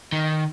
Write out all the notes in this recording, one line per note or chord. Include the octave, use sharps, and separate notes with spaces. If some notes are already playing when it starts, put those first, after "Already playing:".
D#3